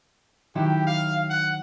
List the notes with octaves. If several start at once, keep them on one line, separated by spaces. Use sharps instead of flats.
D#3 F#3 E4 G4
F5
F#5